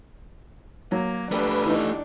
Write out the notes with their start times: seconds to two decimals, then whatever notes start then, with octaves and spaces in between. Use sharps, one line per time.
0.92 F#3 A#3
1.32 A3 D4 G4 B4
1.66 E3 D#4